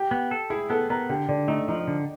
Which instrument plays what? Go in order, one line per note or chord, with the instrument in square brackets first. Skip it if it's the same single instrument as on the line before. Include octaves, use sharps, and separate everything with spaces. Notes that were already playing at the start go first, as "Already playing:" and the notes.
Already playing: [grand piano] G4
[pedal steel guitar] B3
A4
[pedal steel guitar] E4 [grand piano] G#4
[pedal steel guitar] B3 [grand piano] A4
[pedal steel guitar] B3 [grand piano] A#4
[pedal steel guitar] D3 [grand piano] G4
[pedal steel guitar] D3 [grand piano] D4
[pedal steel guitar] A3 [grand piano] D#4
[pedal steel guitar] F3 [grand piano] D#4
[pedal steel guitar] D3